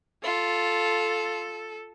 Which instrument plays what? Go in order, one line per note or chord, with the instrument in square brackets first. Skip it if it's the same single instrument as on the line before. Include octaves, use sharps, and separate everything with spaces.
[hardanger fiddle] F4 [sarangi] A4